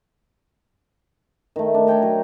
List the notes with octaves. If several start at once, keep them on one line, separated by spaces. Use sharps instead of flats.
D#3 A3
D4
A4 C#5 G5 A#5
F#3